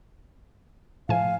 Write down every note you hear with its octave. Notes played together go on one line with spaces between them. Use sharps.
A2 F3 F5 G#5